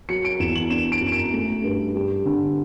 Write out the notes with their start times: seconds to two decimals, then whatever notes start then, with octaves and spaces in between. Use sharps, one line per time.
0.09 F#3 C#7
0.25 D7
0.40 E2 E7
0.55 F#7
0.70 D4 E7
0.92 D7
1.01 F#2
1.07 E7
1.12 D7
1.34 A3
1.64 G2
1.95 G3
2.26 D3